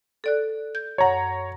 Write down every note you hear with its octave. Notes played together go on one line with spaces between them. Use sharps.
A4 D5 F#6
G6
F#2 C#5 F#5 A#5